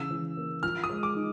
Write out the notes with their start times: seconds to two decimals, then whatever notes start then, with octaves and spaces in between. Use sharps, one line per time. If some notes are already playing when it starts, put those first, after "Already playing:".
Already playing: C#3 E3 E6
0.10 E3
0.37 A#3
0.63 F3 F6
0.84 D#6
0.90 G#3
1.03 D6
1.16 D#4